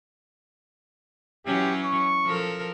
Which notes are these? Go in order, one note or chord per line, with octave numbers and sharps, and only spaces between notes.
E3 F#3 C#4 G4
C#6
F3 A4 A#4